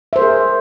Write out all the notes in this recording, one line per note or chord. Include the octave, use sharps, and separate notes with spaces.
G#4 A#4 C5 E5